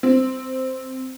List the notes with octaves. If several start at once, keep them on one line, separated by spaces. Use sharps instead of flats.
C4